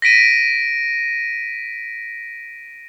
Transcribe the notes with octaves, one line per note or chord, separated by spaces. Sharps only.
A#6 B6 D7 D#7